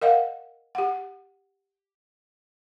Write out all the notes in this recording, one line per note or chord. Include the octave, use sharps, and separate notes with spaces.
A#4 D#5 F5 F#5
G4 F#5